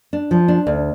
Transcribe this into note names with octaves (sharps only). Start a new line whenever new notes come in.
D4
F3
D4
D2